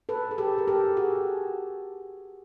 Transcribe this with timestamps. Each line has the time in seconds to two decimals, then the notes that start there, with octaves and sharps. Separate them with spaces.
0.09 A4 B4
0.31 G#4
0.38 G4 A4
0.58 A#4
0.67 G4 A4
0.97 F#4 G#4